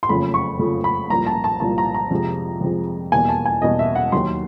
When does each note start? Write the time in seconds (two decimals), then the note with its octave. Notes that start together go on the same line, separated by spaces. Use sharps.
0.03 C6
0.09 F#1 F2 C#3 F3 A3 B5
0.34 C#6
0.59 F#1 F2 C#3 F3 A3
0.84 B5
1.10 C2 A#2 F3 A#3 A#5
1.26 A5
1.44 A5
1.60 C2 A#2 F3 A#3 A5
1.78 A#5
1.94 A#5
2.11 F2 C3 F3 G#3
2.61 F2 C3 F3 G#3
3.12 E2 B2 G3 A#3 G#5
3.29 A5
3.46 G#5
3.62 E2 B2 G3 A#3 D#5
3.79 E5
3.95 F#5
4.12 D#2 D#3 F#3 C6